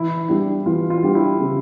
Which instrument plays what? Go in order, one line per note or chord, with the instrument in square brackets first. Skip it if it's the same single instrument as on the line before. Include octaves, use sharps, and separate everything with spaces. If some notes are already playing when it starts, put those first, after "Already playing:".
Already playing: [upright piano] E3 [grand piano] E4
[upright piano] G3 D4 G4 [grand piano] E4
[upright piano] E3 [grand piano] F4
[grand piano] F4
[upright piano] G3 D4 G4
[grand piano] E4
[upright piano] C#3